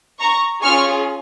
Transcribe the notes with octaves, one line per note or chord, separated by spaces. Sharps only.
A#5 C#6
C#4 F4 G#4 C#6 F6